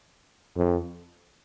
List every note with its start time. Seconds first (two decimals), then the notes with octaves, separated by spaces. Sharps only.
0.57 F2